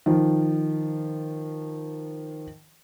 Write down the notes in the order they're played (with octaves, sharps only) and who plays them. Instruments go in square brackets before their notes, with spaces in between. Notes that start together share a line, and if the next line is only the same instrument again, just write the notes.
[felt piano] D#3 F3